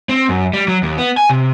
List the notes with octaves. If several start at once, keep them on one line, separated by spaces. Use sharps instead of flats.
C4
F#2
G3
F#3
D#2
B3
G#5
C3